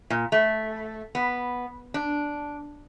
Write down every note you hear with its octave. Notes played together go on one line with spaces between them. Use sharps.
A#2
A3
B3
D4